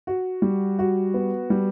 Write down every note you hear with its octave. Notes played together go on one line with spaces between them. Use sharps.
F#4
G3
F#4
B3
G3